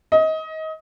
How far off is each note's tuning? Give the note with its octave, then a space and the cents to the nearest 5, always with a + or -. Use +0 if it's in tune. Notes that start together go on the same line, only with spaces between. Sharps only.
D#5 +25